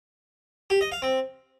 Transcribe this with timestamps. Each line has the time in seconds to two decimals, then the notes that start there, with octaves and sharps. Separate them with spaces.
0.70 G4
0.81 D#5
0.92 F5
1.02 C4